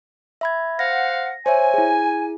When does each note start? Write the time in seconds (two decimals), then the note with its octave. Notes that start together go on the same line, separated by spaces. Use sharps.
0.41 E5 B5 G#6
0.79 C5 F5 F#5 A#6
1.46 C5 C#5 E5 G#5
1.74 E4 G#4